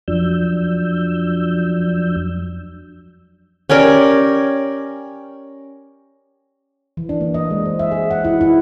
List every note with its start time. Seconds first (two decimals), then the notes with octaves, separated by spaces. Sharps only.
0.08 F2 F3 F#3 D4 E6 G6
3.70 C#4 G4 A#4 D5
6.97 E3
7.09 D4
7.21 A#3
7.34 D#5
7.51 G#3
7.66 C5
7.79 E5
7.91 G#4
8.11 F#5
8.25 E4
8.41 E4